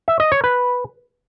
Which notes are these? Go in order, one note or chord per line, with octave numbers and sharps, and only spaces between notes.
E5
D#5
C#5
B4